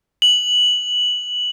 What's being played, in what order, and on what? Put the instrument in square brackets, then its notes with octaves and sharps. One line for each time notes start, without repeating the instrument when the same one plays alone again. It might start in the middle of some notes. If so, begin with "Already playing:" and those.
[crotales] F#7